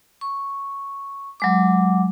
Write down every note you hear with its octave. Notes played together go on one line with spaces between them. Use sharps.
C#6
F#3 G#3 D6